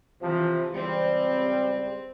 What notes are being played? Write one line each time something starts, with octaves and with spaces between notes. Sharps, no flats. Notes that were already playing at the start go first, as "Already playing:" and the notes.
C3 E3 F3
C#2 G3 C4